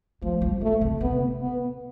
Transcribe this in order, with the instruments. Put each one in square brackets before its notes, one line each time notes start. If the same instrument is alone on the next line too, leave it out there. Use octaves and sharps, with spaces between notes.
[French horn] F3 [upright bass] A3
[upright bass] G3
[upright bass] F3 [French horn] A3
[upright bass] C3
[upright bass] C3 [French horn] B3
[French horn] B3